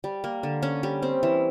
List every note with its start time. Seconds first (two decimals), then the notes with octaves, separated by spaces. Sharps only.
0.04 G3
0.24 A#3
0.43 D3
0.63 C#4
0.83 G3
1.03 C4
1.23 E3